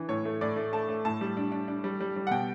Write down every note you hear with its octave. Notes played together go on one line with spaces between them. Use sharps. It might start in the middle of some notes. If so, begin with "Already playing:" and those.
Already playing: E3 D4
A2 C#5
A3
A2 D5
A3
A3 A5
A3
A2 A5
G3
D4
D4
D4
G3
G3
G3
F#5
B2 G5